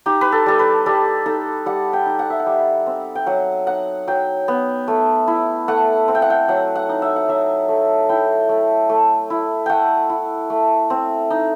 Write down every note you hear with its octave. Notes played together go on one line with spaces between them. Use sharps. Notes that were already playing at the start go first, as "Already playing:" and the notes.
D#4 G4
B4
A4
G3 A4
B4
G3 A4
D#4 A4
G3 F#5
G5
D#4
F#5
E5
F#5
G3
C4
G5
F#3 F#5
D#4 F#5
F#3 G5
B3
A3
E4
A3 F#5
C4
G5
F#5
G5
F#3 F#5
F#5
D#4
E5
F#5
F#3 E5
A3
E4 G5
A3
A3
E4
A3 F#5 G5
E4
A3
C4
D#4